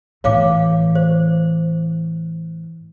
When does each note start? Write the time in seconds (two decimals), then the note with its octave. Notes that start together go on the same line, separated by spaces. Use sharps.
0.24 A2 E3 C#5 F5 D6
0.95 C5